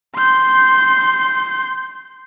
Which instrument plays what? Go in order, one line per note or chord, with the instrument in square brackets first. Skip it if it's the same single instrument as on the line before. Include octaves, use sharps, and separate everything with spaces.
[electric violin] C6 G6